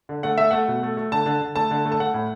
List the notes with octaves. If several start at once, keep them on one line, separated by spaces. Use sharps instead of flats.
D3
A3 F#5
A3 E5
A3 F#5
B2
A3
A3
D3 A5
D3
D3
A3 A5
D3
A3
A5
A3 F#5
A2